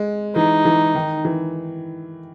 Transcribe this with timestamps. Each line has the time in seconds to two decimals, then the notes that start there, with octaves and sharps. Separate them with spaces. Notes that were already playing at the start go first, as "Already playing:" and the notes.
Already playing: G#3
0.36 E3 D#4
0.65 E3
0.95 D#3
1.25 E3